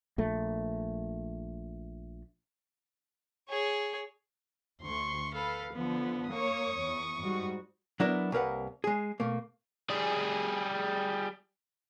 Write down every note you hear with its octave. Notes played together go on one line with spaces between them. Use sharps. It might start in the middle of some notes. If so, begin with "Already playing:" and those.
A#1 A3
G#4 C#5
D2 C6 C#6
A4 B4 F5
D3 F3 B3
A#3 C#5 C#6 D#6
E2
G#2 G3 F#4
F#3 B3 D4 E4 A#4
C2 A#3 A#4 B4 F#5
G#3 G#4
B2 A3 A#3
G3 G#4